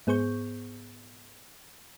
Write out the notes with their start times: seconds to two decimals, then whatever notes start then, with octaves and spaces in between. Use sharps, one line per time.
0.07 G#2 B3 G#4 C5 C#6 G6